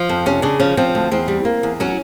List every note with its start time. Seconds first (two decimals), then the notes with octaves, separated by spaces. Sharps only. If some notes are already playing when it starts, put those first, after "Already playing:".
Already playing: F3
0.09 F2
0.26 C3 C#4
0.42 C#3 D4
0.60 F3 C#4
0.77 F3 C4
0.95 D2
1.11 E2 C4
1.28 G3
1.45 A#3
1.63 E2
1.80 F#3 C#4